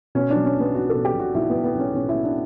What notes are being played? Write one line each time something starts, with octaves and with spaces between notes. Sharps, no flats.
B2 C#4
D4
F#3
C#4
B1 B3
B1 F#4
A4
B2
G4
B1
F#4
B1 E4
B3
B1
B3
B1 C#4
B1 C#4
E4
B2
D4